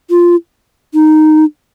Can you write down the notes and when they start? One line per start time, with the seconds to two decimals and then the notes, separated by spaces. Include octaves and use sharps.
0.10 F4
0.94 D#4